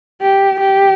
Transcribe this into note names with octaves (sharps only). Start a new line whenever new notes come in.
G4
G4